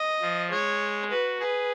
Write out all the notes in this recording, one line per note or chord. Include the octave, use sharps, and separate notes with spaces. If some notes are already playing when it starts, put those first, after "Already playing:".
Already playing: D#5
F3
G#3 C#5
F#4 B4
G#4 B4